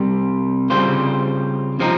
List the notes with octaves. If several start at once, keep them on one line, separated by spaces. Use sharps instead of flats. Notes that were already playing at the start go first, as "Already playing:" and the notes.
Already playing: C2 C3 G3
C#3 G3 C4 F4 C5
C3 F3 C4 D#4